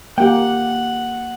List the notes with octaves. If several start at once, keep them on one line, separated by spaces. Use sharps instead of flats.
A#3 G4 F#5 G5